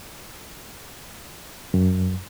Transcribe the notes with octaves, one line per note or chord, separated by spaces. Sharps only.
F#2